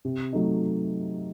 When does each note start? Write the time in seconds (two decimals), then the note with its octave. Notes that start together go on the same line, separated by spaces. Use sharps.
0.05 C3
0.33 F#3 A3 D#4